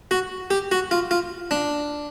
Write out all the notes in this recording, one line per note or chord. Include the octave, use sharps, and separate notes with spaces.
F#4
G4
F#4
F4
F4
D4